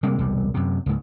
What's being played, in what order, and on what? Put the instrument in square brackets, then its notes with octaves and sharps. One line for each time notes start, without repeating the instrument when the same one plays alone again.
[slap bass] C3 G3 G#3 A#3
E1 C2 G3
F#2 C3
C#2 G#2